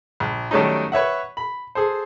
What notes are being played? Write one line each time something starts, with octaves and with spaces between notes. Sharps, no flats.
A#1
D#3 F#3 G3 A3 C#4 D#4
B4 C#5 E5 F#5
B5
G#4 A4 C5